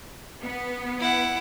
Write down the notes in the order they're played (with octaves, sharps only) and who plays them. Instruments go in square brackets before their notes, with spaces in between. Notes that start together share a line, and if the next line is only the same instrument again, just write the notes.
[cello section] B3
[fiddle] E4 F#5